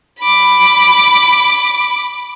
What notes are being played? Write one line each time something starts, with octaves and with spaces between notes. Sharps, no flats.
B5 D6